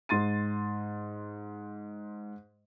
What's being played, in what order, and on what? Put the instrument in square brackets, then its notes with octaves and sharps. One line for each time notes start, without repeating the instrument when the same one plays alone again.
[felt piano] G#2 C6 A6 D#7